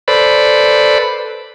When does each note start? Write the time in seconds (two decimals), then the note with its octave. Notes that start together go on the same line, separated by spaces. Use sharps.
0.08 A4 B4 C5 D5 B5